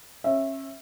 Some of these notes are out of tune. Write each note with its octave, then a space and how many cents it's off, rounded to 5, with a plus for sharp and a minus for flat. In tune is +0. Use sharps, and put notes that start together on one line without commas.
C#4 -30 E5 +0